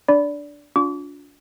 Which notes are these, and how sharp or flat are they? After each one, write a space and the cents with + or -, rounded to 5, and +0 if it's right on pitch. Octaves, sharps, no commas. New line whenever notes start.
D4 +0 D5 -20 B5 +0
D4 -30 F4 +35 D6 -40